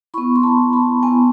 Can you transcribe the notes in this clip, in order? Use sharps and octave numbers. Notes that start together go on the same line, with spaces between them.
B3 E4 B5 C#6
C6
A5 B5
A5 B5
B3 E4 G#5 A#5